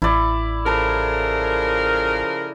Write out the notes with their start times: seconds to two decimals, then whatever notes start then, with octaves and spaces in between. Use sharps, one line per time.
0.02 A1 E4 D5
0.66 C#3 F3 A4 A#4